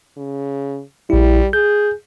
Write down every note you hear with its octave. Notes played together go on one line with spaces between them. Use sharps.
C#3
A#1 G3 E4
G#4 G6